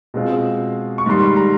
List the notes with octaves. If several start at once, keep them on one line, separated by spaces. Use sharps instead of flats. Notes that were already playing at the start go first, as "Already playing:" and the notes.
B2 G#3 C4 F4
C#6
G#2 D#3 G3 C6
B5
A#5